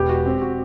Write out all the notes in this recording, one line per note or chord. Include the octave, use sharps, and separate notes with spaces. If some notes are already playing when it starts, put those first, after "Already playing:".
Already playing: E1 B3 G4
F#4
C4
F#4